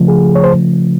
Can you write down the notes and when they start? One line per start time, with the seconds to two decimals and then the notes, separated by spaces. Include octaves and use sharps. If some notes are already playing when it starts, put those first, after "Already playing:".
Already playing: C#3 F3 A3
0.08 G#4
0.35 C#5
0.44 C5